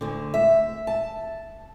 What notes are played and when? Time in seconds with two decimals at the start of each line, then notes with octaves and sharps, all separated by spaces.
0.01 D2 D3
0.34 E5
0.87 A5